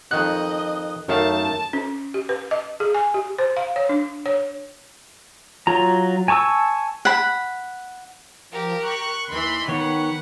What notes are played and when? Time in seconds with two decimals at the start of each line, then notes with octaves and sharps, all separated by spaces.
0.11 F2 D#3 D#5 F#5 F#6
1.09 F#2 D#3 A3 F5 A5
1.73 C#4
2.14 G4
2.29 B4
2.51 D#5
2.80 G#4
2.94 G#5
3.14 G4
3.38 C5
3.57 F5
3.76 C#5
3.89 D4
4.26 C#5
5.67 F#3 F4 A#5
6.28 G#5 A5 C#6 D6 E6
7.05 F#5 B5
8.51 F3 G4 A#4
8.82 C#6 F#6
9.27 D#2 E3 B5 C6
9.68 D#3 B3 B4 C#5 F#5